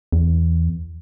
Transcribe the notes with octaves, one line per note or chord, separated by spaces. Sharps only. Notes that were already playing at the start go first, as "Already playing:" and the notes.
E2